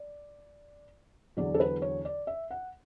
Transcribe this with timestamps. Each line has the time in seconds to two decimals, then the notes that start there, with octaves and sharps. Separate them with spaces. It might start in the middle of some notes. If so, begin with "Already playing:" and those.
Already playing: D5
1.37 E2 D3 F#3 D5
1.54 A4
1.60 B4
1.82 C#5
2.05 D5
2.27 E5
2.51 F#5